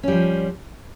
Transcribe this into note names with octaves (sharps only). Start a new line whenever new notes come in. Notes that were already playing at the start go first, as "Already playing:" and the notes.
F3 G3 C#4